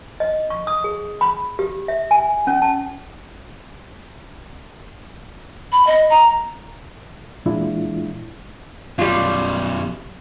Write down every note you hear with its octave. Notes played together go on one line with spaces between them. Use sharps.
D#5
C#6
D#6
G#4
B5
G4
E5
G#5
C#4
A5
B5
D#5
A#5
A#2 E3 G#3 D4 E4 F4
F#2 B2 G3 F4